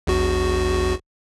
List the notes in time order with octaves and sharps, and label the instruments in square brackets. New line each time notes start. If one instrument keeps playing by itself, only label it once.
[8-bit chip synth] A#1 E2 F#4